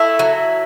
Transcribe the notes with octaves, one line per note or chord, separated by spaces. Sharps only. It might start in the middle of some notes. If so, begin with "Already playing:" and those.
Already playing: A3 E4
F#3